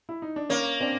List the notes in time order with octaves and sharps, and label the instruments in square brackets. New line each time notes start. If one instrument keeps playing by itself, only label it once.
[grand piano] E4
D#4
D4
[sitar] A#3 [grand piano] C#4
[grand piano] C4 D4